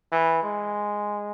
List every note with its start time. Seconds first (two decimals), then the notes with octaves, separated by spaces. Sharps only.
0.12 E3
0.43 G#3